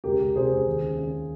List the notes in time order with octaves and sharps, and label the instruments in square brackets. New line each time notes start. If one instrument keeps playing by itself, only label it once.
[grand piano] C#2 G4 A#4
C#2
C3 G#4 C5
C#2
D#2
C#3
C#3